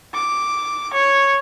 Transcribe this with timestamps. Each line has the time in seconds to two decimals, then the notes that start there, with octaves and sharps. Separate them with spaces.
0.15 D6
0.94 C#5